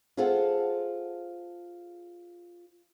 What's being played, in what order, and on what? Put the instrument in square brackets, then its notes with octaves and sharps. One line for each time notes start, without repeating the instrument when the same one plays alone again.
[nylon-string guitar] F4 G#4 A4 C5 F5 F#5